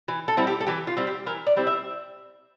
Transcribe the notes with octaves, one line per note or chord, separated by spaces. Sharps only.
E3
A4
G3 C4 E4
G4
A4
E3 G4
F4
G3 C4 E4
G4
E3 A#4
D5
G3 C4 E4
E5